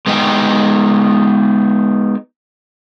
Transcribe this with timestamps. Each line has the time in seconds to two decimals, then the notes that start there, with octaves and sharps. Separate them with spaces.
0.06 G#3 B3 D#4 B4 G5 G#5